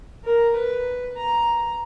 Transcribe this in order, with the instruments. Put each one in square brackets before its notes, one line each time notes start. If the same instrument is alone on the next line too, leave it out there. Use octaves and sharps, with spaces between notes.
[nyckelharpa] A#4
B4
A#5